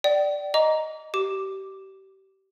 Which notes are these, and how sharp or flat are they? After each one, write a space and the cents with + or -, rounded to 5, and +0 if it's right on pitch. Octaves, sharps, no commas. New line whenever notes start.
D5 +0 G5 -35
D#5 +0 A#5 +0 D6 -35
G4 -30 D6 +0